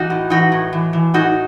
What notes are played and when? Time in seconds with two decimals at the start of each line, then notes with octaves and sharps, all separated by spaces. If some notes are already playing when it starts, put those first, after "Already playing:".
Already playing: E3 D#4 F#4
0.10 A2
0.30 E3 D#4 F#4
0.52 A2
0.73 E3
0.93 E3
1.14 A2 D#4 F#4